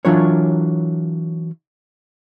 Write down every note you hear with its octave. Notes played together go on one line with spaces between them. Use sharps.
E3 F#3 D4 F4 A#4 C#5